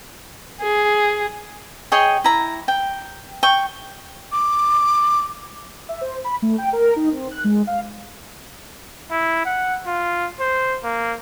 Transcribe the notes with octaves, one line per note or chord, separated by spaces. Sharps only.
G#4
G#4 C#5 D#5 G5
E4 A#5
G5
G5 C#6
D6
E5
C5
B5
A3
G5
A#4
D#4
C4
F#6
G#3
F5
E4
F#5
F4
C5
A#3